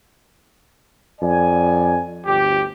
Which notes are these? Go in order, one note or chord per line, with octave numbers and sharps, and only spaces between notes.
F2 D5 G#5
G1 D2 G4